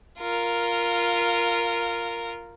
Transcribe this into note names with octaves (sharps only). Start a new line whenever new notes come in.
F4 A#4